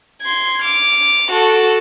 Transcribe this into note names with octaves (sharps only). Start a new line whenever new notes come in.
C6 G#6
D6 F6
F#4 A4